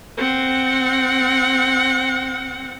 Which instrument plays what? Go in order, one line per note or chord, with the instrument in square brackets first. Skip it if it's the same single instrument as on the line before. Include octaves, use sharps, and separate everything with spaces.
[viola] C4 F#5